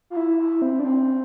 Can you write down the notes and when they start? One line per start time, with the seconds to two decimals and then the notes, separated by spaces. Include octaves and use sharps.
0.10 F4
0.17 E4
0.39 E4
0.62 C4
0.80 D4
0.85 C4